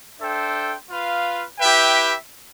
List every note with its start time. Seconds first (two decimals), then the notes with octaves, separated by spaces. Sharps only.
0.19 D4 A4 C5 E5 G5
0.88 F4 B4 F5
1.59 E4 G4 B4 E5 G5